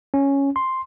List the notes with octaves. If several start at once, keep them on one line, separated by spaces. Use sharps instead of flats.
C#4
C6